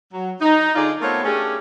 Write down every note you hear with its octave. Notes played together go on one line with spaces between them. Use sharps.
F#3
D#4
D3 D#4 F4 G#4 D5
A3 B3 C4 F4 A#4 C#5
A3 C#4 D4 G4 G#4